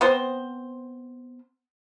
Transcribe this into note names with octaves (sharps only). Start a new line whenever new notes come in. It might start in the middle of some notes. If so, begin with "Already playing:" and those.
B3 C4 C5